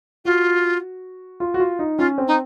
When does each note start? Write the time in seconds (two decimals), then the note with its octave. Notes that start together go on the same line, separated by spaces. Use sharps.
0.25 F4 F#4
1.40 F4
1.54 F#4
1.60 F4
1.79 D#4
1.98 C#4 F4
2.18 C4
2.27 D#4